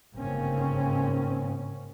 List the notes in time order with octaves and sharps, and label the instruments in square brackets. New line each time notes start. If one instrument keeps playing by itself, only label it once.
[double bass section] G1 G#2 C#3 A#3 C4 C#4